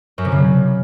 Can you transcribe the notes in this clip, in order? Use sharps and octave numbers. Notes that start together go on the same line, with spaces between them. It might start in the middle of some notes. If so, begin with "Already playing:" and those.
F#2
C3
C#3